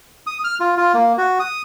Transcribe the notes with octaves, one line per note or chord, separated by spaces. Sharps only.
D#6
F6
F4
F4
A#3
F#4
D#6